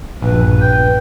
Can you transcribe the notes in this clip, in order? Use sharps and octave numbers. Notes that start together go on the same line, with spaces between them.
A#1 G2 B2 B4
G5